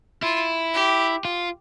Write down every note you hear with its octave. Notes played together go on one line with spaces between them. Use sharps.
E4 F4
G4
F4